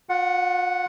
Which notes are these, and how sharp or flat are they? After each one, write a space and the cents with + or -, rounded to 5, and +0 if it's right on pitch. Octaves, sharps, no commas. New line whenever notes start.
F4 +40 F#5 +0